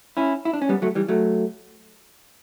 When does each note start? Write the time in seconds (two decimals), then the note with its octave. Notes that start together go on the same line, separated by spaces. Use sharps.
0.17 C#4 E4
0.45 E4
0.53 D4
0.62 C#4
0.69 G3 B3
0.82 F#3 A3
0.95 E3 G3
1.08 F#3 A3